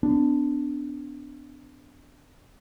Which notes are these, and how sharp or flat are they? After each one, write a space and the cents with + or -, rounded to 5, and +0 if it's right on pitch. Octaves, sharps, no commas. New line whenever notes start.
B3 +45 D4 +0